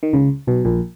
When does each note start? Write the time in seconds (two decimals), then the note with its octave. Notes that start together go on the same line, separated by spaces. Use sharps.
0.03 D#3
0.13 C#2 C#3
0.47 B1 B2
0.65 A#1 A#2